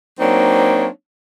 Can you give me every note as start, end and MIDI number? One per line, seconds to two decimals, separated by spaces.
0.19 0.88 54
0.19 0.88 58
0.19 0.88 60
0.19 0.88 62
0.19 0.88 63
0.19 0.88 73